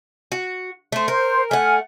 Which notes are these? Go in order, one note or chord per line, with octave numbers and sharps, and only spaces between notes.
F#4
A3 C5
A#4 C5
A3 F#5 G#5 F6